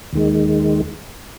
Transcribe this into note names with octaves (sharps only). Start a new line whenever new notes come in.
D#2 D#3 G#3